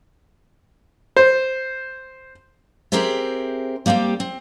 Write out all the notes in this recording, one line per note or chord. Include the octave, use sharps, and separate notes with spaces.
C5
C4 G4 G#4 A#4 C5 E5
G3 A#3 C4 D#4 G4
C4